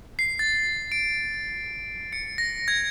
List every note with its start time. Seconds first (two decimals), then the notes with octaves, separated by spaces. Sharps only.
0.19 C7
0.39 A6
0.92 D7
2.13 C#7
2.38 A#6
2.68 G#6